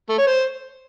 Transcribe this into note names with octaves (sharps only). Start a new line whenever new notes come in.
A3
C#5
C5